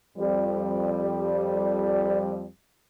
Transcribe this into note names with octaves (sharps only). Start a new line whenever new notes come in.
F2 G3